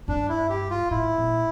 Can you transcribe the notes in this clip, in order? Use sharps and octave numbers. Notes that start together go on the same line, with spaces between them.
G2 D4
E4
G4
F4
A2 E4
A#2